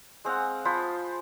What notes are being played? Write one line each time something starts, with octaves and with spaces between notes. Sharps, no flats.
G#3 C4 F5 F#5
F3 F4 C5 B5